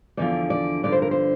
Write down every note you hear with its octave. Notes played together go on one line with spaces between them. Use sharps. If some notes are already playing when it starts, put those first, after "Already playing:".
E2 D3 F3 D5
D5
G2 D3 F3 D5
C5
A#4
C5